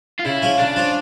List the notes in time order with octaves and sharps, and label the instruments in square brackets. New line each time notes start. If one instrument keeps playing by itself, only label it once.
[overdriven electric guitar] F4
[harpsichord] C#3 [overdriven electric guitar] E4
[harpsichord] F3 C#4 F4
[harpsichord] C#3 [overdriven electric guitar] D4
[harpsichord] F3 C#4 F4